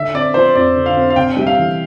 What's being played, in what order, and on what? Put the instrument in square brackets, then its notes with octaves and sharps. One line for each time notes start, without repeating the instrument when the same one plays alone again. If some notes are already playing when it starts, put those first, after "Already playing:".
Already playing: [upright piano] D3 [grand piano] E5
[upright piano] C4 [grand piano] D5
[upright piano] F3 [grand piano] C5
[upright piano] F2 [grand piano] D5
[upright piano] D3
[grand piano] F5
[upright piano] C4
[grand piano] F5
[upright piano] C3 [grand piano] G5
[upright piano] G3 [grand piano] E5
[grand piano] F5
[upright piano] E3